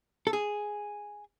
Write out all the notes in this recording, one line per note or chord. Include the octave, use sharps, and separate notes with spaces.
A4
G#4